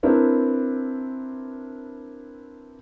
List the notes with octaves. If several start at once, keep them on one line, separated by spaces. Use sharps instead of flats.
C4 D4 E4 A#4 B4